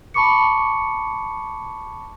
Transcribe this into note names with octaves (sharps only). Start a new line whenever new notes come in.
A5 B5 C#6 D6 C#7